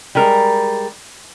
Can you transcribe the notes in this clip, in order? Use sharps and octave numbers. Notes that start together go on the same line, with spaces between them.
G3 G#3 A#4